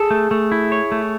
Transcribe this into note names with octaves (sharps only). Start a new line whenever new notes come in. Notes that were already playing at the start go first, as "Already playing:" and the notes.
Already playing: G#4 A4
A3
A3
E4
C#5
A3